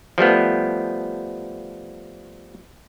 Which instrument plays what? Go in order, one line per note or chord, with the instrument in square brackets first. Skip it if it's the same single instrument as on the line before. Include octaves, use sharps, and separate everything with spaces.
[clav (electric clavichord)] F3 G3 A3 B3